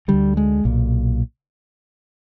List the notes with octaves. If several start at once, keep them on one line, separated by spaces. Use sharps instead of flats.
D2 D3 G3
G#3
B1 A#2